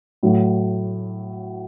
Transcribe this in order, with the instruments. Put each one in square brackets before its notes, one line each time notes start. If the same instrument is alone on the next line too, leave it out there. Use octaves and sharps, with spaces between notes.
[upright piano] A2 F#3 A3